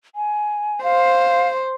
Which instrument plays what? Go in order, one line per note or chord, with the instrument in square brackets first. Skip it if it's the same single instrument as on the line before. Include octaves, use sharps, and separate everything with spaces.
[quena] G#5
[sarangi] C5 [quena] F5